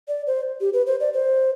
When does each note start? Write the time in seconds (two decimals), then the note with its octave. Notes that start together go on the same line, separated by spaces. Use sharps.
0.08 D5
0.27 C5
0.61 G4
0.73 B4
0.87 C5
1.00 D5
1.14 C5